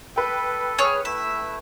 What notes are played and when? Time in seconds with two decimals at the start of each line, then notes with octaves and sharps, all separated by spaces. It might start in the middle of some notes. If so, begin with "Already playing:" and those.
0.16 A4 B4 G5
0.78 G#4 C#5 F6
1.05 A3 E4 E5